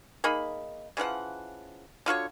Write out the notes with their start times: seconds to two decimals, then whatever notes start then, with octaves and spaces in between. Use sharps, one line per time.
0.24 A#3 D#4 G#4 B5
0.97 C#3 E3 F3 F#5
2.06 D3 F4 F#4 C#5